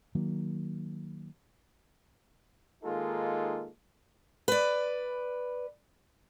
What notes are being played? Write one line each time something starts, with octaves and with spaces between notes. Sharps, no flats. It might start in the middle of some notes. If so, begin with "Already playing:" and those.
D#3 F#3 A#3
D#3 G#3 A#3 D#4 F4 A4
B4 D5